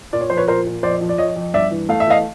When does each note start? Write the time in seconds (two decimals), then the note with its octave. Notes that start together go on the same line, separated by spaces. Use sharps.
0.13 A#2 D5
0.21 C#5
0.30 F3 C5
0.37 B4 C#5
0.48 A#2 A#4 C5
0.66 A#2
0.83 F2 C5 D5
1.01 F3
1.09 D5
1.18 F2 C#5 D#5
1.36 F2
1.54 G2 D5 E5
1.71 E3
1.89 A3 F5
2.00 E5
2.07 E3 D#5 F5